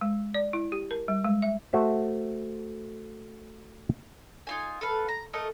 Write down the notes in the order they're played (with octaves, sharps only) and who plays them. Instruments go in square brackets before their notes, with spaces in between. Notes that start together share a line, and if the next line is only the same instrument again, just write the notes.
[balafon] G#3
D5
E4
G4
A#4
G3
G#3
E5
[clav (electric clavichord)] A3 F#4 C5 E5
[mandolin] D#4 F4 G#5
A4 B4 F5
A#5
A3 A4 A#4 D#5